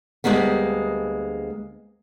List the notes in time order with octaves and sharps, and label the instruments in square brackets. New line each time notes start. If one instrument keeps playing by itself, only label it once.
[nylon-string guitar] D2 B2 G3 G#3 A#3 B3